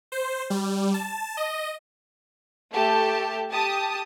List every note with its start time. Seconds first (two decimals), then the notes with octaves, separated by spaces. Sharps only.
0.12 C5
0.50 G3
0.94 A5
1.37 D#5
2.73 A3 G4 A5
3.49 G4 A5 D#6